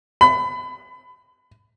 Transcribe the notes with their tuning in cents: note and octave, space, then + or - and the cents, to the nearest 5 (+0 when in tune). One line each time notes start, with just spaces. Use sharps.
B5 +30